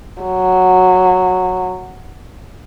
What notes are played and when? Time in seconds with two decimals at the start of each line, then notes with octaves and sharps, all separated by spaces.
0.22 F#3